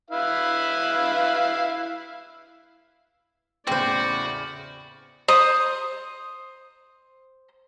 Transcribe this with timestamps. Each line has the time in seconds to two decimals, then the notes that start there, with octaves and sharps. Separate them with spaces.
0.10 E4 B4 F5
3.67 E2 A2 C#3 C4 F#4 C5 D5
5.28 C5 D#6